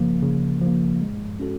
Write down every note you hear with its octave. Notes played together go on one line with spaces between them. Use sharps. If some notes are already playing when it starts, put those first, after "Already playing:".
Already playing: C#3 F3 A#3
C#3
F3 A#3
G#3
C#4 F#4 A4